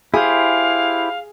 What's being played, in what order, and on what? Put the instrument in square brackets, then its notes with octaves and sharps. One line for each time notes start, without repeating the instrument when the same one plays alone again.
[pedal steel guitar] E4 G4 C5 [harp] G#4 [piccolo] F5